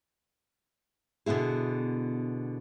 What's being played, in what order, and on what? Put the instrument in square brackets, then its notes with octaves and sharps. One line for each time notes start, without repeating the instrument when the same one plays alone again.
[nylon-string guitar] B2 D3 B3 E4 G#4